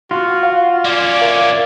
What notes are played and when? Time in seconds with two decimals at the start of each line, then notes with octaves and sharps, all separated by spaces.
0.11 F4 F#4
0.43 F5 F#5
0.85 A#3 C#4 D5
1.18 A#4 E5 F5